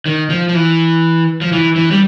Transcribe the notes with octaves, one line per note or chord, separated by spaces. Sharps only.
D#3
F3
F3
E3
F3
E3
E3
G3